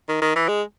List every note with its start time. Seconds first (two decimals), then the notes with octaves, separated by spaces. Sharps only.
0.09 D#3
0.22 D#3
0.36 E3
0.48 G#3